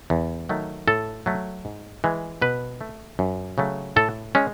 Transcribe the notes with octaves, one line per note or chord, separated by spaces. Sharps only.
E2
D#3 F#3 A3
A2 A4
F#3 A3
G#2
E3 G#3
B2 B4
A3
F#2
C#3 F#3 A3
A2 A4
G#3 C#4